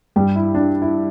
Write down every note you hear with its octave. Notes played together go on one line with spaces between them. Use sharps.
G2 G3 G4
E4
D4
E4